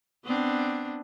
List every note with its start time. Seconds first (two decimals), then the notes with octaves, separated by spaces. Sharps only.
0.25 B3 C4 D4